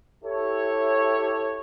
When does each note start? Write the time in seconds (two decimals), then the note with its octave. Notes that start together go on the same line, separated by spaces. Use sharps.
0.24 E4 G4 A4 C#5